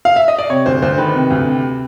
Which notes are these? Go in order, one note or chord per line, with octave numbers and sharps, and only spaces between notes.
F5
E5
D#5
D5
C3 C#5
D2 C5
D2 C5
D#3 B4
C3
D2
C3